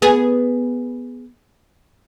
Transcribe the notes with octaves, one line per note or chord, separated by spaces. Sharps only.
B3 G#4